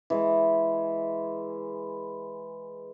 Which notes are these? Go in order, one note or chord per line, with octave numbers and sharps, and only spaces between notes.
E3 G#3